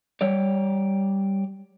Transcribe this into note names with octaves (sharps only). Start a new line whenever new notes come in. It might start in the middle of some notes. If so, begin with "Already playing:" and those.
G3 C#5 D5